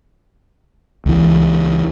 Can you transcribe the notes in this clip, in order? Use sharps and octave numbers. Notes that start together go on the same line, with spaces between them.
C#2 E3